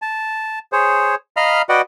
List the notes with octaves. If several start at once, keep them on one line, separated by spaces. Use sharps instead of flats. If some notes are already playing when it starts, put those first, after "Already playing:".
A5
G#4 C5 C#5
D#5 F5 A#5 B5 F6
F#4 B4 D5 D#5 F#5 G5